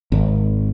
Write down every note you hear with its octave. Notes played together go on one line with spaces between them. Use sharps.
G#1